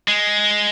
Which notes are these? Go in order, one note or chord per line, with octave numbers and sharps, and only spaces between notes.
G#3